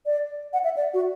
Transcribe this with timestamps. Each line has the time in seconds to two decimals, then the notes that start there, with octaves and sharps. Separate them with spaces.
0.06 D5
0.53 F#5
0.64 E5
0.76 D5
0.94 F#4